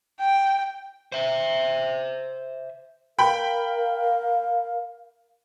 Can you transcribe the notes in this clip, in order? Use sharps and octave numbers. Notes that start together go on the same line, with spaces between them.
G5
C5 E5
A#4 F5 G5 B5